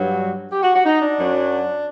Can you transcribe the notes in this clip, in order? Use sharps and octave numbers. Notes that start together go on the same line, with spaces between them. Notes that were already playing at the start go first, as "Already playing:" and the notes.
Already playing: G2 F#3
G4
F#4
F#4
D#4
D4
F#2 F#3